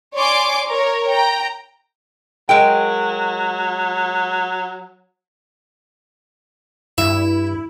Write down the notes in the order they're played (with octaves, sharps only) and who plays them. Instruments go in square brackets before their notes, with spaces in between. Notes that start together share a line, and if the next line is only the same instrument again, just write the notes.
[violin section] C#5 D5 G#5 C6 D6
A#4 C#5
G5 A#5
[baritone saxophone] F#3 [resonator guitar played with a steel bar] G#3 A#4 G5
[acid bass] G2 [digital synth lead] E4 [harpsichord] E5